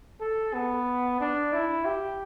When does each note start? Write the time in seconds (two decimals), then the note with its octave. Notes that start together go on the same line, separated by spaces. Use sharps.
0.21 A4
0.54 B3
1.21 D4
1.53 E4
1.85 G4